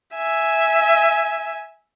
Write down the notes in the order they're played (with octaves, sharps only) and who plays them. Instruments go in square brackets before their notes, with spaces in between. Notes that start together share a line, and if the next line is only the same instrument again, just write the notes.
[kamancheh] E5 G#5